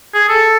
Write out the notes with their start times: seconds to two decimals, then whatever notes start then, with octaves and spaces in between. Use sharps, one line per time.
0.14 G#4
0.29 A4